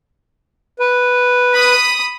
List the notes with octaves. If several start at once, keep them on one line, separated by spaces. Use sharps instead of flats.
B4
B5 D#6